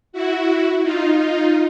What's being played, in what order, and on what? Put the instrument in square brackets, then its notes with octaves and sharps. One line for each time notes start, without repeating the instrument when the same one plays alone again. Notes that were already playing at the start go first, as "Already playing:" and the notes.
[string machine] E4 F#4
D#4 F4
D#4 F4